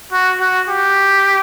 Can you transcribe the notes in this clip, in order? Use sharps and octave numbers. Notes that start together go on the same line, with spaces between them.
F#4
F#4
G4